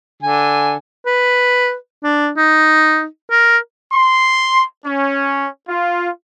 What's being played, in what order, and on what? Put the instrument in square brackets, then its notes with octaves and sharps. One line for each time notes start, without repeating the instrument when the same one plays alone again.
[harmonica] D3 G#5
[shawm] B4
D4
D#4
A#4
[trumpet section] C6
C#4
F4